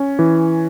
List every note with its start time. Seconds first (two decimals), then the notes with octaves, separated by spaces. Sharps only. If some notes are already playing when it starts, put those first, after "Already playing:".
Already playing: C#4
0.19 E3